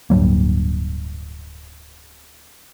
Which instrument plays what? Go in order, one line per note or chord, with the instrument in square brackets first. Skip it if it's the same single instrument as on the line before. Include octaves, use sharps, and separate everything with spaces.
[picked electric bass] D1 G2 F#3 A#3